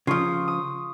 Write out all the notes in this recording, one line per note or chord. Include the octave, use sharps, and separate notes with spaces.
C#3 F3 F4 C#6 D#6
D#6